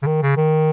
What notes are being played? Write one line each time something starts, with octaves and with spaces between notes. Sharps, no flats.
C#3
D#3
C#3
D#3